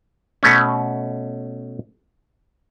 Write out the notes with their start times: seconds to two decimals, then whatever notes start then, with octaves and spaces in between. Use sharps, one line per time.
0.43 B2 A3 C#4